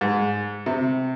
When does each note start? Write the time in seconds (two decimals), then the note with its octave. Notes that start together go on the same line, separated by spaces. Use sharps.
0.01 G#2
0.66 C3